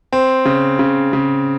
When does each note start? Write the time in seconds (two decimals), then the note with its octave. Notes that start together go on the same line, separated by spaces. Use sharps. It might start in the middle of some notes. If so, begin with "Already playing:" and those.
0.13 C4
0.45 C#3
0.79 C#3
1.13 C#3